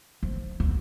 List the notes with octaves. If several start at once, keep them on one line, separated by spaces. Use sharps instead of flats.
F3
D2